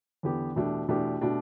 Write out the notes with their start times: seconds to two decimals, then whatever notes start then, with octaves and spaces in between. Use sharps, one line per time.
0.23 E2 D3 B3 G4
0.56 E2 B2 A3 D4 G4
0.88 E2 B2 A3 D4 G4
1.21 B2 A3 D4 G4